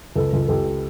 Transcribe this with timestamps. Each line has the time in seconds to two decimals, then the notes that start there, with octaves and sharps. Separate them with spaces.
0.16 C#2 A4 B4
0.33 C#2
0.48 C#2 G4 A4